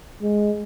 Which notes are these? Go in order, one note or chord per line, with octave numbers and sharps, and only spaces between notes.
G#3